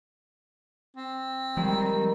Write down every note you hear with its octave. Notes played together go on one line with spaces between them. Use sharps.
C4
D#3 F3 G3 G#3